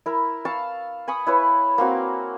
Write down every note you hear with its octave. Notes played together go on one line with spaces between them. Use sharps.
E4 A#4
F5 A5 C#6 E6
G#5 B5 C#6 D#6
E4 B4 C#5
A#3 C4 F#4